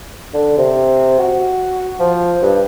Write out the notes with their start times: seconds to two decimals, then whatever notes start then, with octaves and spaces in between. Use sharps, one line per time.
0.34 D3
0.58 C3
1.19 F#4
1.99 F3
2.42 G2